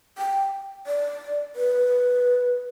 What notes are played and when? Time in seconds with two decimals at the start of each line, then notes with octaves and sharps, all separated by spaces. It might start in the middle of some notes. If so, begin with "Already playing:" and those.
0.18 G5
0.87 D5
1.56 B4